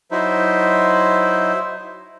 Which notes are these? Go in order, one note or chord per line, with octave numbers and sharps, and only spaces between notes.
F#3 D#4 E4 C5 E5